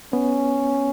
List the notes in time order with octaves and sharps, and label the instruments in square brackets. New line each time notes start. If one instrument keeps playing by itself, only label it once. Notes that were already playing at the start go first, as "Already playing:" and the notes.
[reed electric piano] B3 [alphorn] C#4